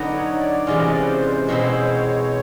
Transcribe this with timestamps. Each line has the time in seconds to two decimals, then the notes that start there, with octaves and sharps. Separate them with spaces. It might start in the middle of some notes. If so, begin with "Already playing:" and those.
Already playing: D3 F#3 B3 D#4 F#4
0.13 C#5
0.40 D5
0.67 C3 E3 G#3 C#4 F4 D5
0.79 D#5
0.92 D5
1.01 B4
1.07 C5
1.49 B2 G#3 C4 E4 C5
1.62 C#5
1.75 C5
1.89 C#5